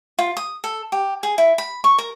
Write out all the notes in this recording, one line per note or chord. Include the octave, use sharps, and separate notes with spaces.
F4
D#6
A4
G4
G#4
E4
B5
C#6
A#4